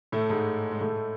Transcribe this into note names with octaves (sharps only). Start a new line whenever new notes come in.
A2 A3
G#2 G#3
G#3
A2 A3